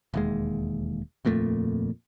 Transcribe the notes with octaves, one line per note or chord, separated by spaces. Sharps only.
E1 D#2 G#3
D#1 F2 A#2 A3